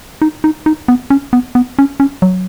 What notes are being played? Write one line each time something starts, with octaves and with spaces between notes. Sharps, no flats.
D#4
D#4
D#4
B3
C#4
B3
B3
C#4
C#4
F#3